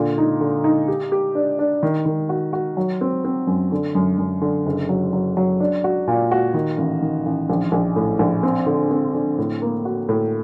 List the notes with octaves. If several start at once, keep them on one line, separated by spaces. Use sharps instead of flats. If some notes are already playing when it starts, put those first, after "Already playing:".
Already playing: A#2 D3
D#4
D3
D#4
G4
G4
D4
D4
D#3
D#3
F#4
F#4
F#3
C4
C4
F#2
D3
F#2
F#2
D3
F#1
F#3
F#3
F#3
D4
F#4
A#2
F#4
D#3
A1
D#3
A1
A#1
A#1
A2
A#1
C4
D3
C4
D3
A2
A#3
F#4
A2